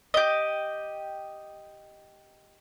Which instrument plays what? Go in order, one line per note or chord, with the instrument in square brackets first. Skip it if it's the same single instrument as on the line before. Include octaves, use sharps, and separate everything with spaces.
[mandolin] G4 D#5